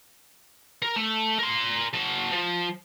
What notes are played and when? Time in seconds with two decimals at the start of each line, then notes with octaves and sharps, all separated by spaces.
0.82 A#4
0.96 A3
1.39 A#4 C6
1.93 F#3 A5
2.32 F3